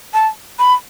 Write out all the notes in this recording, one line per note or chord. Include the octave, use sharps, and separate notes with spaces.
A5
B5